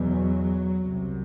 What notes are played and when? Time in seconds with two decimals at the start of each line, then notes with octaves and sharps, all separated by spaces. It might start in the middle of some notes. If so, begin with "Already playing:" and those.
Already playing: E2 B2 F#3
0.78 C2 C3